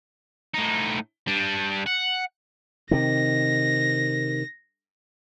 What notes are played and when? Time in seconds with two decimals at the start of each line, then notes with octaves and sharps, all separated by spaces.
0.54 A2 D#4
1.28 G3 D4
1.86 F#5
2.91 C3 D#3 A#6